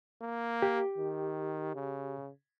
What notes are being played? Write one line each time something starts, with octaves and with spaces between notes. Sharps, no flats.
A#3
G4
D#3
C#3